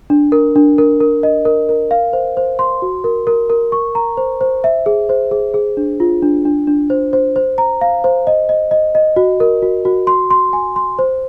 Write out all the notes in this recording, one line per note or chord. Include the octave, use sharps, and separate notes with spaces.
D4
A#4
D4
A#4
A#4
D#5
A#4
A#4
F5
C5
C5
C6
F#4
A#4
A#4
A#4
C#6
A#5
C5
C5
E5
G#4
C5
G#4
G#4
D4
F4
D4
D4
D4
C5
C5
C5
A#5
F5
C5
D#5
D#5
D#5
D#5
F#4
A#4
F#4
F#4
C6
C6
G#5
C6
C5